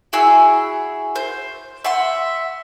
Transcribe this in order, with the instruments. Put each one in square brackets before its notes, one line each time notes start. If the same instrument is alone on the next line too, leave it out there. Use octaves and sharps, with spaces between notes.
[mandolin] E4 F#4 G#4 E6
C5
E5 F#5 C6